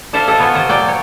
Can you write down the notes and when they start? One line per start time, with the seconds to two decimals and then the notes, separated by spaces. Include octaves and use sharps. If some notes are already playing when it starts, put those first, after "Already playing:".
0.13 E4 A4 C5 D5 E5 F5
0.27 E4 A4 D#5 E5
0.40 B3 F4 C#5 G#5
0.54 C3 C5 C#5 D#5
0.68 A#2 F#3 D5 G5
0.88 C#5